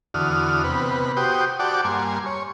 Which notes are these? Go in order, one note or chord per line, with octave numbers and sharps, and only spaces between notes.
E2 D3 F#4 D#6 F6
C3 B3 B4
F#4 G4 C5 G5 D#6
F#4 G4 D5 F#5 A5 D6
G2 A#3 G#5 C6
C#5